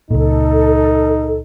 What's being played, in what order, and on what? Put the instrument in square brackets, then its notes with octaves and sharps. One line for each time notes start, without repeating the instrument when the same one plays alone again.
[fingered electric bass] C#2 A#2 [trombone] D#4 [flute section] A4